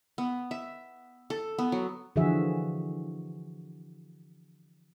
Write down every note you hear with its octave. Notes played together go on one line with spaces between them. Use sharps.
B3
E5
A4
B3
F#3
D3 E3 F3 F#4 G#4 E5